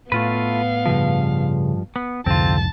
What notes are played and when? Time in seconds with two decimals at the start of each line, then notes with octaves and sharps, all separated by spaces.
0.12 A2 A3 B3 F4 B4 F5
0.86 G2 C#3 F3
1.96 B3
2.26 C2 F2 G#2 D3 C4 F4 A5